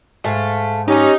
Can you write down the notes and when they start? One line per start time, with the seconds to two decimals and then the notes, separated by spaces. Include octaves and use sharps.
0.24 G#2 A3 F5
0.88 C#4 D#4 G4 G#5